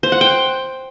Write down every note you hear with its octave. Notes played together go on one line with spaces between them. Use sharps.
C5
F#5
G5